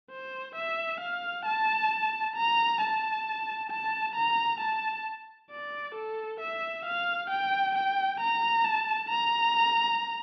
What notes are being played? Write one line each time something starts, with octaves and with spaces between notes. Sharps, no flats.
C5
E5
F5
A5
A#5
A5
A5
A#5
A5
D5
A4
E5
F5
G5
G5
A#5
A5
A#5